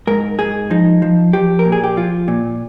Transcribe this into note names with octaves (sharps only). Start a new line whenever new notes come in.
G#2 A#4
G#2 G#4
F3 D#4
F3
F3 G4
A#4
A#2
G#4
G4
F3 F4
A#2